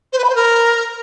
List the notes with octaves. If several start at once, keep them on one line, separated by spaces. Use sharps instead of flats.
C5
B4
B5
C5
A#4